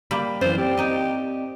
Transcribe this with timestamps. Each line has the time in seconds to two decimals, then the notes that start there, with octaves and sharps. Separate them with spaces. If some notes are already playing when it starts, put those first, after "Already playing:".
0.11 G3 A#3 B5
0.41 F#2 E3 F4 C5
0.58 C4 G4 D5
0.77 D#4 D#5